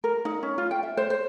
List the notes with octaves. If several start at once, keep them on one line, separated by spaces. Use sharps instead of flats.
A#4
D#4
C#4
F4
G5
E5
C5
C5